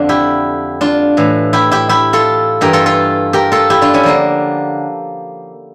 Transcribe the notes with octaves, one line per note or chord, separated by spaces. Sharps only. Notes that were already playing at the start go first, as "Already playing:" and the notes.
Already playing: F2 D3 F3 D4
E4 G4
D4 F4
A2 E3
E4 G4
E4 G4
E4 G4
F4 A4
G2 E3 G4 A#4
F4 A4
F4 A4
G4 A#4
F4 A4
E4 G4
D4 F4
C#4 E4
D3 F3 A#3 D4